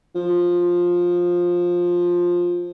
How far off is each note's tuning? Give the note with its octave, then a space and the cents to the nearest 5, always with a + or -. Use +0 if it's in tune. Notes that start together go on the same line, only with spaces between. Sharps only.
F3 +10